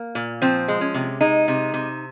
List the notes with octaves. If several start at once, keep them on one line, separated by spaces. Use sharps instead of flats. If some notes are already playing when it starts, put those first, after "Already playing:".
Already playing: A#3
A#2
F3 C4
G#3
C#4
C3
G#3 D#4
C3
C3